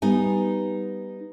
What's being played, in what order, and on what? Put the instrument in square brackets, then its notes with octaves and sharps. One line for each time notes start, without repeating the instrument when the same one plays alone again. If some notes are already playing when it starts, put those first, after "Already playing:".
[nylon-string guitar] G3 B3 D#4 G#5